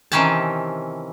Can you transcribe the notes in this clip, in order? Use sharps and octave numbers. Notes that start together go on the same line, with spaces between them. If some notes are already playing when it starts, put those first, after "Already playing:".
C3 D#3 E3 C#4 G5 A5